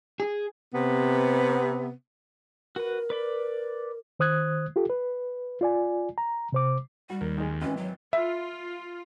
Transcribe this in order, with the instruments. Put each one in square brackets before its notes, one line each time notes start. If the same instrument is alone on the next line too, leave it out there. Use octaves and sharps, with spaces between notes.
[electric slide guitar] G#4
[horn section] C3 B3
[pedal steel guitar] F#4 B4 [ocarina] A#4
[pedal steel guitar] B4 D5 B5
[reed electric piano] D#3 C5 D#6 F#6 G#6
F4 G4 A4
B4
F4 D5 G#5
A#5
C3 C5 D6
[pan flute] G3 [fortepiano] F#4
[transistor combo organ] D#2 [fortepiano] A#4
[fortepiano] D#3 G#3
[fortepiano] G#1 E3 [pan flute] C#4
[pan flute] F#3
[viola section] F4 [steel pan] E5